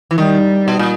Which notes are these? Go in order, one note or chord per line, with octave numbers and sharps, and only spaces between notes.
E3
D#3 G3
B2
A#2